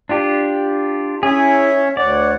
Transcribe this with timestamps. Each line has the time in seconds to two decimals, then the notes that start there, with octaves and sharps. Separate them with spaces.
0.09 D4 F4 G4
1.23 C#4 E4 G#4 C#5 E5
1.97 D2 C#5 D5 F#5